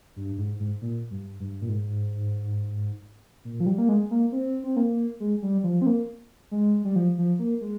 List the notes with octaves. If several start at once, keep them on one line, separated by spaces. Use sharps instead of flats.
G2
G#2
G#2
A#2
G2
G2
A#2
G#2
A#2
F3
G3
A#3
G#3
A#3
C4
C4
A#3
G#3
G3
F3
C4
A#3
G#3
G3
F3
F3
A#3
G#3